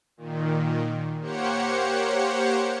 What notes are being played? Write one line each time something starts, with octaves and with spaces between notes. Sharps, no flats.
A#2 D#3
A#3 G4 C5 C#5 F#5 C#7